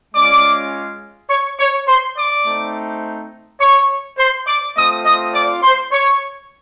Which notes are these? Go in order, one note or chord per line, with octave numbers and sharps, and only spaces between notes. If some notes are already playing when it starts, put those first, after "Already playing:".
G#3 C#4 F4 D5 D6
C#5 C#6
C#5 C#6
C5 C6
D5 D6
A3 C4 D#4
C#5 C#6
C5 C6
D5 D6
A3 C4 F4 D#5 D#6
D#5 D#6
D5 D6
C5 C6
C#5 C#6